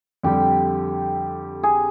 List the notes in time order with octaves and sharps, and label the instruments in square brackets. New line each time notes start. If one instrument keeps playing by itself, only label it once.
[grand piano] F2 D3 G3 [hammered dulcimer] G4
[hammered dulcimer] G#4